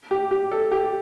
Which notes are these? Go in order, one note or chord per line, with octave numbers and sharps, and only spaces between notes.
G4
G4
A4
G4